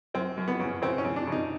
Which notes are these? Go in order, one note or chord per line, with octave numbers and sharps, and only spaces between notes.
F#2 C4
F#2
B3
C#3
C#3 C4
C#4
C#3
D4
C#3 D#4